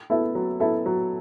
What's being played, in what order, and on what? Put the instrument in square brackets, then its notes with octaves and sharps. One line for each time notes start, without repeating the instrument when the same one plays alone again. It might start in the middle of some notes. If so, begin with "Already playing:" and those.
[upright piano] B3 E4 A4 E5
F#3
B3 E4 A4 E5
F#3